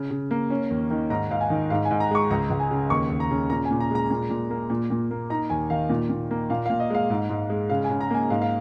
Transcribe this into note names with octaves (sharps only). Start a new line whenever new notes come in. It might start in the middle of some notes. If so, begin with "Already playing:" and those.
Already playing: C#3
C#3
A#3
C#4
D#2
D#3
G#2 A#5
G#2 F5
G#5
D#3
G#2 F5
G#5
G#2
A#5
G#3 C#6
C#2 A#5
C#2
G#5
C#3
D#2 C#6
D#2
A#5
C#3
A#2 A#5
G#5
A#2
A#5
G#3 A#5
A#2
A#2
A#3
A#2
A#2
A#3
D#4 A#5
D#2 G#5
D#3 F5
A#2
A#2
A#3
A#2 F5
F5
A#2
D#5
G#3 F5
G#2
G#2
G#3
C#3 F5
G#5
C#3
A#5
A#3 G#5
G#2 F5
F5